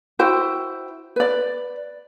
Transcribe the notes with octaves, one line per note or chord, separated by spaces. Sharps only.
E4 F#4 C5 G5
B4 D5